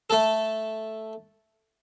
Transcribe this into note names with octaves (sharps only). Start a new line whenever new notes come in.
A3 A4